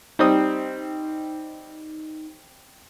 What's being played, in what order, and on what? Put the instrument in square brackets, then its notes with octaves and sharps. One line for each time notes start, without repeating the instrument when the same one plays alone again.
[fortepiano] G3 C4 D#6 [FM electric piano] D#4